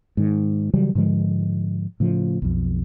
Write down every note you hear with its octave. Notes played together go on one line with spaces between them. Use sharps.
G#2 D#3
C#3 E3 F#3 G3
G#2 D3 F3 G#3
A2 C#3 F3
B1 F2